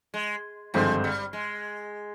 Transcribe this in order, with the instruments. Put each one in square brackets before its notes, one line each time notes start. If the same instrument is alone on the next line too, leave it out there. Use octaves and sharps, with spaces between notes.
[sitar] G#3
[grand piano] G#1 G2 D3 G#3 C4 [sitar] F3
[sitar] G3
G#3